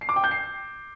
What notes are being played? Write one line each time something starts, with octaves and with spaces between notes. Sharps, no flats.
C7
D6
G5
G6
C7